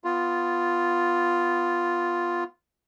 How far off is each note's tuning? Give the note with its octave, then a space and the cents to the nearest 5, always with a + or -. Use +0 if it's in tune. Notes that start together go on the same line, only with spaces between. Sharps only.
B3 +10 F4 +0